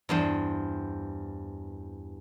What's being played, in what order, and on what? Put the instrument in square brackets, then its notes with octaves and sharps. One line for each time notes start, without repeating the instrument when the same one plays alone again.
[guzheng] E2 G2 C5